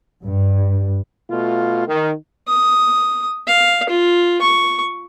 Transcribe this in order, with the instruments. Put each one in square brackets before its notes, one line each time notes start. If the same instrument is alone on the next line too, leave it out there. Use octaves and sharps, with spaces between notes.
[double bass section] G2
[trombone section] B2 A3 F4
D#3
[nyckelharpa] D#6
F5
F4
C#6